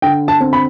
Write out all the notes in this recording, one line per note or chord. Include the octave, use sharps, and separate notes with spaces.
D3 G5
A5
C4
B5